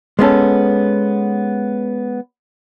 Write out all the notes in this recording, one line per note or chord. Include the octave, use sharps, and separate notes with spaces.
G#3 B3 C#4 A4